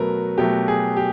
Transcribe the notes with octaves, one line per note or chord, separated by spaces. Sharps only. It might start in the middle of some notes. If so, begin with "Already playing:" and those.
Already playing: B2 F#3 A3 A#4 B4
B2 F#3 A3 G4
G#4
G4